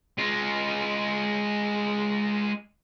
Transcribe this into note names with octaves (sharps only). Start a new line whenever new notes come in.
G#3 F4